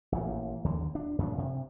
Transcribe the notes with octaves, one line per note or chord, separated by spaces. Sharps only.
A1 A#2
D#2 D3
D4
F#2 A#2 B3 D4
C3